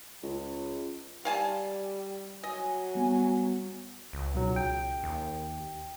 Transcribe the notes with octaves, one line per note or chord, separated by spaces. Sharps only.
C#2
G3 F5 G#5 A5
F#3 D#5 G#5
G3 B3
C#2
B1 F#3
G5
D#2